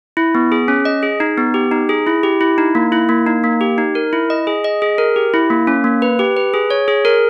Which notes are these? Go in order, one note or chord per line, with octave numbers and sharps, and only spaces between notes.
E4
B3
G#4
C#4
D#5
G#4
D#4
B3
G4
D#4
G#4
E4
G4
E4
D#4
A#3
E4
A#3
D#4
A#3
G4
D#4
A#4
E4
D#5
G#4
D#5
G#4
A#4
G4
E4
A#3
C#4
A#3
B4
G4
B4
G#4
C#5
G#4
A#4